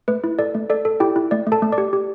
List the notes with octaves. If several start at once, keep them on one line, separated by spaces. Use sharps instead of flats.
A3 B4
E4
A4 D5
A3
A4 D5
A4
E4 G4 G5
E4
A3 D5
A3
A4 A5
A3
D5 D6
G4
G4